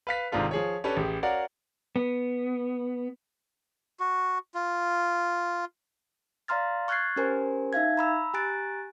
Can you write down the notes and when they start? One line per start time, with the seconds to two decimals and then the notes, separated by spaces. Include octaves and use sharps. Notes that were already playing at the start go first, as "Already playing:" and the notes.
0.07 B4 F5 B6
0.32 G#1 G#2 C3 D4 F4 A4
0.51 F3 G#4 C#5
0.84 C#4 D4 G4 A4 B4 C#5
0.97 A1 G4 G#4
1.23 F#4 A#4 C#5 D5 F5 F#5
1.96 B3
4.00 F#4
4.54 F4
6.48 D5 F5 A#5 C6 F6 A6
6.88 C#6 F6 F#6 G#6 A6 C7
7.16 C#4 G4 A#4 C5 G#5
7.73 D#4 E5 F5 G#6
7.97 A#5 B5 E6
8.34 G4 G#5 A#5 F#6 A6 D7